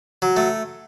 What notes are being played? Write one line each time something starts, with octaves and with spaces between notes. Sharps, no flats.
F#3
A3